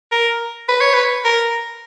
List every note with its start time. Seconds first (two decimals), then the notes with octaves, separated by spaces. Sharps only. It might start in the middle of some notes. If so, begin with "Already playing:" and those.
0.12 A#4
0.69 B4
0.81 C#5
0.94 B4
1.25 A#4